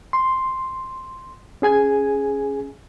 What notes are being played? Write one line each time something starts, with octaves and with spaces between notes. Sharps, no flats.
C6
C#4 G#4 G#5 G#6